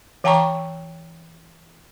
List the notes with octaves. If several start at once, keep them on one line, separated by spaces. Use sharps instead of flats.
E3 F5 G5 A5 A#5 C#6